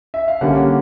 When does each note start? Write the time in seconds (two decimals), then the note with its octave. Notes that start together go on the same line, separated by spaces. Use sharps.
0.14 E5
0.28 F5
0.41 D3 G3 A#3 C#4 F#5